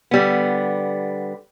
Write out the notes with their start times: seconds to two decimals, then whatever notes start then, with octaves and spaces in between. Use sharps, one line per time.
0.11 D3 G3 B3